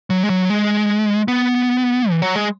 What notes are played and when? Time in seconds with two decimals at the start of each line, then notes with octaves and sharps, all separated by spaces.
0.10 F#3
0.23 G#3
0.30 F#3
0.50 G#3
1.28 B3
2.10 E3
2.22 F#3
2.36 G#3